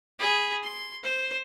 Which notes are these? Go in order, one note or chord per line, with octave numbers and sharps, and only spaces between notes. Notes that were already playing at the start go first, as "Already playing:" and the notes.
G#4 B5
C6
C5